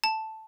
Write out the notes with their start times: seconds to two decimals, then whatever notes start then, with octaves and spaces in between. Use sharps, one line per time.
0.04 A5